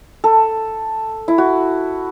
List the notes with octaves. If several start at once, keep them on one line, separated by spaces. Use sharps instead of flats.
A4
E4
F#4